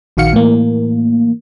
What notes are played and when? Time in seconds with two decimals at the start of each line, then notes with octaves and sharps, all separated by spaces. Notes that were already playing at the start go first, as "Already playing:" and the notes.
0.17 A#1 D#3 F#4 F5 C#7
0.33 A2 E3 A#3